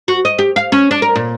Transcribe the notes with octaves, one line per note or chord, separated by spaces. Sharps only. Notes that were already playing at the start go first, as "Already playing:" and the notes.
F#4
D#5
G4
F5
C#4
D4
A#4
A#2